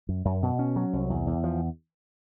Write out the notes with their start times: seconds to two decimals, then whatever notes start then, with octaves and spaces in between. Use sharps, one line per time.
0.09 F#2
0.25 F#2
0.43 B2
0.59 C#4
0.76 F#3
0.93 C2
1.10 E2
1.27 E2
1.44 F3